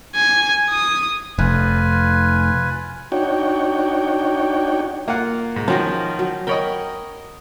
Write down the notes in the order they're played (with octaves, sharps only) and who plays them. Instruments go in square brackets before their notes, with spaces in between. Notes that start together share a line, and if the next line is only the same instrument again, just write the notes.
[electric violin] G#5
D#6
[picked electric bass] F1 [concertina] F4 B4 G#5
[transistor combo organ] D4 D#4 F#4 C#5 G5
[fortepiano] A#3 F4 F#5
G#2
[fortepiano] D#3 F3 [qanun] C#4 F#4 D#5
[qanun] F#3
[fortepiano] A#4 C#5 D#5 [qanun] G5 B5